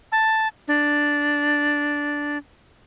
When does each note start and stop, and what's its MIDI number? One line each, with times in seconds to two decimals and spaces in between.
0.12 0.48 81
0.68 2.38 62